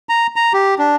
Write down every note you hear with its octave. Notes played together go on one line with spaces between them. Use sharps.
A#5
A#5
G4
D4